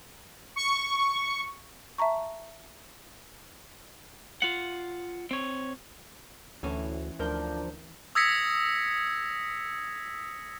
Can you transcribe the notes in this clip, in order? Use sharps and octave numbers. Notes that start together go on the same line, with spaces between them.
C#6
E5 A5 A#5 C#6
F4 F#5
C4 C#5
D2 A2 E3 C#4
D2 F3 D4 A#4 G6
D#6 E6 G#6 A#6 B6 C#7